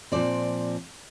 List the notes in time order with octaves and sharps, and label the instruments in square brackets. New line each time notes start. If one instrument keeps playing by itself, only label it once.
[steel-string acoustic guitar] A#2 F3 C4 D5